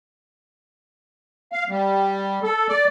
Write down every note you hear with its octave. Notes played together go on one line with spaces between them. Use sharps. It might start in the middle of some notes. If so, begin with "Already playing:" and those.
F5
G3
A4
D5